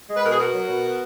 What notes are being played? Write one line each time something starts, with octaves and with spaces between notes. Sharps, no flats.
G#3
B4
B2 A#4
G#4
B3 F#4 A#4
F#3
B2
B3